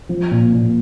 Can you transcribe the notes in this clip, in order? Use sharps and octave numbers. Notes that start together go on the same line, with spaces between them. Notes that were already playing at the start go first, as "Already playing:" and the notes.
F3
A#2
A#2